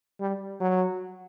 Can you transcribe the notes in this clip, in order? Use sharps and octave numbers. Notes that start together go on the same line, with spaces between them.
G3
F#3